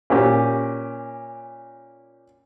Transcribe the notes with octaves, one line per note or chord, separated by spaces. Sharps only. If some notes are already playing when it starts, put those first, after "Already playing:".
A#2 C#4 G4